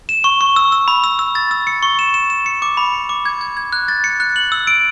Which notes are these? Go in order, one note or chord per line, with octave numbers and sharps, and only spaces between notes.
E7
C#6
C#6
E6
E6
B5
E6
E6
A6
E6
C#7
C#6
E7
E7
E7
C#7
D6
B5
C#7
D6
G#6
G#6
G#6
F#6
A6
C#7
F#6
F#7
E6
D7